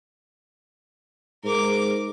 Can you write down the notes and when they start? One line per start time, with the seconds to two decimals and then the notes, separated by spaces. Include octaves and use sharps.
1.44 G#2 A#4 D6